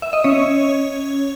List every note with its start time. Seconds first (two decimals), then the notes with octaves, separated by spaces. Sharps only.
0.02 E5
0.13 D#5
0.24 C#4 C#5